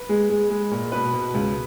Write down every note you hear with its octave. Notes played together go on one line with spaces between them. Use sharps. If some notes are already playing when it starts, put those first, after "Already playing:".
Already playing: B4
G#3
G#3
G#3
A#2
B2 B4
B2
C#2